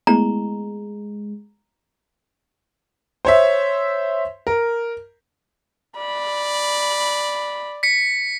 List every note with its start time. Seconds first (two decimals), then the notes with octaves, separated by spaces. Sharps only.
0.07 G#3 A3 B3 E4 A#5
3.25 C5 C#5 E5
4.47 A#4
5.98 D5 B5
7.83 B6 C#7